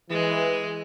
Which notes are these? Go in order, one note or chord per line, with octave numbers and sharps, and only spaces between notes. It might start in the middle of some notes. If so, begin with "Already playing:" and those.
E3 G#3